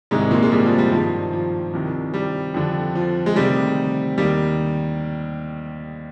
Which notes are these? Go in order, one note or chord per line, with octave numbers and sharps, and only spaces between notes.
C2 G#2 C3 D#3 G#3
A#2 A#3
G#3
G3
F3
G3
G2 D#3 F3
F3
C2 C3 D#3
G3
F2 D3
F3
G#3
D2 C3 D#3 G3
D#2 D#3 G3